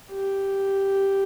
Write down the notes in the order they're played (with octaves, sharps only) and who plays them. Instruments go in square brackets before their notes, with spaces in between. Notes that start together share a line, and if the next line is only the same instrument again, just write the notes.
[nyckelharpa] G4